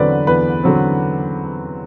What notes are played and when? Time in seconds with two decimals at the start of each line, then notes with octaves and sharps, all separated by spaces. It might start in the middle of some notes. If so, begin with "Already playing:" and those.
Already playing: E2 D3 F#3 C4 B4 D5
0.27 E2 B4
0.63 D3 F#3 C4